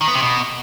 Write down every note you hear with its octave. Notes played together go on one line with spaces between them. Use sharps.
D#3
B3
C3
B2